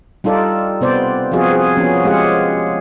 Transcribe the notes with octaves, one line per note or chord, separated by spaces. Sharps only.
G3 D#4 F4 A4 D5
C3 B3 C5 D5
F3 B3 C4 F4 F#4 G#4
G#4
F3 B3 C#4
G#3 F4 G4 G#4 F#5